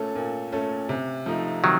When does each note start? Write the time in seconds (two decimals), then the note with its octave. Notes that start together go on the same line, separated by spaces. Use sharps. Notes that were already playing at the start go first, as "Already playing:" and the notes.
Already playing: A#2 A3 C#4 A4
0.16 A#2
0.52 A3 C#4 A4
0.89 C3
1.26 F3 A3 D#4
1.63 C3 D#3 F#3